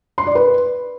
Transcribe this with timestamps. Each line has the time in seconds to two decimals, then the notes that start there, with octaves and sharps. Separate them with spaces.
0.18 C6
0.27 D5
0.35 B4